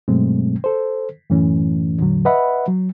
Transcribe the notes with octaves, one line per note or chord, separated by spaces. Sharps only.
G2 B2 F#3 G#3 A3 C4
A4 C5
F#2 A2 E3 A3 C#4
E2 A2 D3 F#3
B4 D#5 E5 F#5 B5
F#3